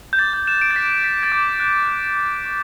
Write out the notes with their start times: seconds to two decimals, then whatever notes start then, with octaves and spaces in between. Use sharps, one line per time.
0.13 G6
0.19 D6 A6
0.33 G6
0.47 F#6 E7
0.61 D7
0.71 A6
0.76 D6 B6
1.04 F#6 B6
1.23 A6
1.32 D6 G6
1.60 F#6
1.88 F#6
2.17 D6
2.45 C#6